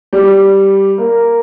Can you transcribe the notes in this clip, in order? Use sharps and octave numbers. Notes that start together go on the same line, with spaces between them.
G3
A#3